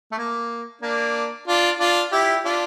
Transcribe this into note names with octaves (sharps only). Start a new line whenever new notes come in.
A3
A#3
A#3 D4
D4 F4
D4 F4
E4 G4
D4 F4